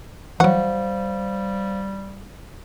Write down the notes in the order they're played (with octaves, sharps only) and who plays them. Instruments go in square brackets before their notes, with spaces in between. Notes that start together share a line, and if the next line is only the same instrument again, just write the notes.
[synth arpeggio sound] E3 F#3 [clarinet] G3 [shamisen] F#4 [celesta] C5 F5